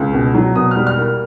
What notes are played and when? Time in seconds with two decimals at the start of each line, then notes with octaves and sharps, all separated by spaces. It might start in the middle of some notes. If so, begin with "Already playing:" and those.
Already playing: C#2
0.13 B2
0.34 F#3
0.55 B2 D#6
0.71 G3 F6
0.87 F6
0.97 A#3 F6